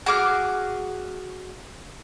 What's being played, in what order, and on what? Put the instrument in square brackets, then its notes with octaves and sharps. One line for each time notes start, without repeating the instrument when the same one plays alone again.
[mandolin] F#4 G#4 D6 F6